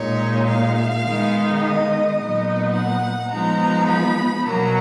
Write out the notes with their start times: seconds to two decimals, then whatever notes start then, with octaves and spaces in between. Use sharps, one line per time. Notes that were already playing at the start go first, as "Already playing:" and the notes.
Already playing: A#2 G#3 D#4 C#5
0.48 F5
1.04 D#3 G#3 B3 D#4
1.61 D#5
2.18 A#2 F#3 B3 D#4 D#5
2.74 F#5
3.31 F3 G#3 B3 D#4 A#5
3.89 B5
4.45 B2 F#3 A#3 A#5